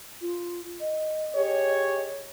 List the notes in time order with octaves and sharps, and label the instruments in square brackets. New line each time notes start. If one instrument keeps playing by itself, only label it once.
[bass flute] F4
D#5
[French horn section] G4 G#4 C#5